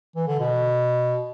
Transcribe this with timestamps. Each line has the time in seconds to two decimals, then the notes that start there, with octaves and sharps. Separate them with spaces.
0.16 E3
0.28 D3
0.40 B2